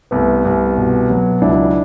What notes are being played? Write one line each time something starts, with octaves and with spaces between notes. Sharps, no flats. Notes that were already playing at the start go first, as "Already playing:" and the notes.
C2 A3 B3
C2
B2
F#3
C#2 D4 E4